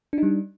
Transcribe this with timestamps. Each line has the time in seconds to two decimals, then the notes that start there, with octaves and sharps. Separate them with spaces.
0.13 D4
0.18 D#4
0.23 G3